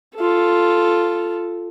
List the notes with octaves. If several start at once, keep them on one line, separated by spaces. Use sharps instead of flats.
F4 A4